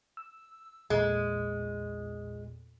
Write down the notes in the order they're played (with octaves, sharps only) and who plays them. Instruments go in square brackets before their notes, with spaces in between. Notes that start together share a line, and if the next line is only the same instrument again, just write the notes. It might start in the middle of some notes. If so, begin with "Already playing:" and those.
[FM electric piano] E6
[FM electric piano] A#1 E2 A#2 [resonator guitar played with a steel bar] G#3